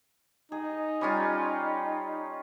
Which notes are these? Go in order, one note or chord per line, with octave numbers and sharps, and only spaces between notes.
D#4 G#4
G3 C#4 F4